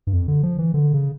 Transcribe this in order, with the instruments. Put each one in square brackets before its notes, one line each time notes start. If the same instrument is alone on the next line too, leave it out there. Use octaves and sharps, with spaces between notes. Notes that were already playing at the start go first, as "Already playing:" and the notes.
[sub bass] G2
F2
D3
F3
E3
D3
C#3